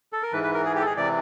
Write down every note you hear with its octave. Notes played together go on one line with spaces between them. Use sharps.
A4
A#4
G#2 E3 B4
B4
A#4
G#4
G4
A4
G#4
C3 E3 D5